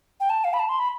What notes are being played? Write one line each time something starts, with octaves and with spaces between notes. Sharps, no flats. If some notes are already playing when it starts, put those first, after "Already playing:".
G5
A5
F5
B5
A5
C6
B5